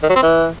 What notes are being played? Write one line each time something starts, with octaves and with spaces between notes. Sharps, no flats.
D#3
F#3
C4
E3